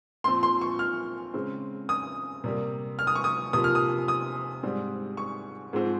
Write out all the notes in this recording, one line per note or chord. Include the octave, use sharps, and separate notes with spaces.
A#2 F3 C4 C6
C6
C#6
F6
C#3 G#3 C4
D#6
C3 G3 A#3
F6
D#6
C#6
D#6
C3 F3 A#3 D#6
F6
D#6
D#6
G#2 G3 C4
C#6
G#2 F3 G#3 C4